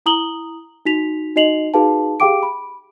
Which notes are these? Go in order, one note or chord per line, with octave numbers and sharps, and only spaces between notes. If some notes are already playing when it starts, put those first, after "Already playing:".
E4 A#5 D#6 F#7 G7
D#4 F#4 B6 F7
D#4 F#4 D#5 C7 F7 F#7
D#4 F#4 G#4 B4 F5 A5
G4 G#4 F5 G5 D6 D7
B5